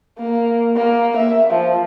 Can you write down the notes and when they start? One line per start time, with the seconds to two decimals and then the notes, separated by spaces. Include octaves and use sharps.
0.18 A#3
0.76 A#3
1.17 E5
1.50 F3